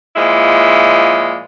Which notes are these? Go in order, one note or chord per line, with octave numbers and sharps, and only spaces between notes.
A#2 F3 G#3 E4